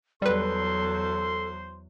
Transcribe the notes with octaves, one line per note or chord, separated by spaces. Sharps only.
E2 F#3 G3 A4 B4 C5 C6